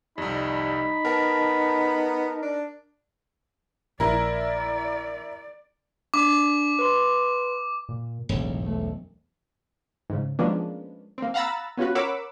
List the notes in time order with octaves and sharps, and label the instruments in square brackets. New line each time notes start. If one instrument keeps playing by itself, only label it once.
[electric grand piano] C2 F2 [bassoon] G3 [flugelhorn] D#4 [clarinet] B5
[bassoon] B3 [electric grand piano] A#4 A5
[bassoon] D4
[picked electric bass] A#1 [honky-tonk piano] E4 A#4 [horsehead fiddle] D5
[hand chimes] D4 [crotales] D6
[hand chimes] B4 C6
[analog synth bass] A#2
[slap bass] E1 B1 [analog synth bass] A2
[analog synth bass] A3
[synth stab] G#2 C#3
F3 G#3 A#3 B3 C#4 D4
A#3 C4
F5 F#5 A#5 B5 E6 A6
B3 C#4 F4 F#4 B4
A#4 C#5 F#5 B5 D6 E6